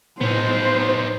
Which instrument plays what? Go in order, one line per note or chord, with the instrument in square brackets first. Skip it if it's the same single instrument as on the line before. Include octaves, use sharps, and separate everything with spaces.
[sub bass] A2 [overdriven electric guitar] B3 D#4 [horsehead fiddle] C5